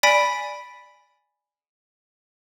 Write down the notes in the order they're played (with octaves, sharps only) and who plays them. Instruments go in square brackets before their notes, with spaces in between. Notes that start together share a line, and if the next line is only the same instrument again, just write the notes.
[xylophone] D5 G#5 B5 B6 D7